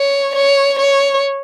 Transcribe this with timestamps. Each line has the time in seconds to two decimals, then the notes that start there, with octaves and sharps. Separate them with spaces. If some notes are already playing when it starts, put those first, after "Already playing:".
Already playing: C#5
0.35 C#5
0.79 C#5